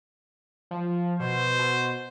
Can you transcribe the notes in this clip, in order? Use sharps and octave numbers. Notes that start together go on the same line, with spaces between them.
F3
B2 C5
B2